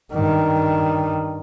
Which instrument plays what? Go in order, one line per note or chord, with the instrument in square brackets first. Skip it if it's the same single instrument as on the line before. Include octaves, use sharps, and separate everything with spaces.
[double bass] G2 D#3